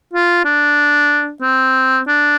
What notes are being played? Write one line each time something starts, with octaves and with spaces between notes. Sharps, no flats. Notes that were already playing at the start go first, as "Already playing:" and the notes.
F4
D4
C4
D4